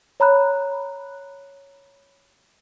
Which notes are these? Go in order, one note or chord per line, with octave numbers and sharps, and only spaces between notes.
C#5 A#5 B5 F#6